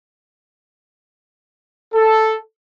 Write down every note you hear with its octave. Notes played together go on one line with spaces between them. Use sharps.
A4